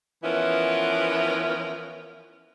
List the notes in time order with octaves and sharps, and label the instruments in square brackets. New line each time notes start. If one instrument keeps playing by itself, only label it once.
[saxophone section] E3 F3 B3 C#4 E4 A#4